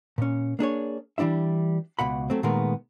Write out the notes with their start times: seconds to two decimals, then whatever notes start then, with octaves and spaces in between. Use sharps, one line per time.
0.18 A#2 C#4
0.59 A#3 D4 G#4 C#5
1.18 E3 G3 D4 E4 E5
1.99 C#2 B2 F#5 B5
2.30 F#3 A3 C4
2.43 A#2 D#3 G#3 A3 B3 A#4